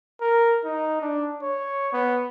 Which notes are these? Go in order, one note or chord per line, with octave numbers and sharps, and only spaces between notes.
A#4
D#4
D4
C#5
B3